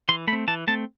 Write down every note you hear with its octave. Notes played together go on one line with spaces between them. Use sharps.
E3 C6
A3 B5
C4
E3 A5
A3 C4 A5